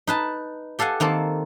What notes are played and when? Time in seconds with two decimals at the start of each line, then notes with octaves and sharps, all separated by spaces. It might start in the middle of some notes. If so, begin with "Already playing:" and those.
0.07 D#4 B4 A5
0.79 G4 A4 F5 F#5 G#5
1.00 D#3 A#3 C4 A4